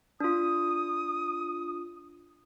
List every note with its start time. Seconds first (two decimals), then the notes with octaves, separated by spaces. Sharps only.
0.20 D4 F4 D#6